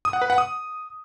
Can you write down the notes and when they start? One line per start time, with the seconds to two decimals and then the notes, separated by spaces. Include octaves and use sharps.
0.05 D#6
0.13 F#5
0.21 B4
0.30 F#5
0.38 D#6